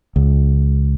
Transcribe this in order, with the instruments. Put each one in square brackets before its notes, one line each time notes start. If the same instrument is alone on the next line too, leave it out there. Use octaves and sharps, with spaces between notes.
[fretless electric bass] C#2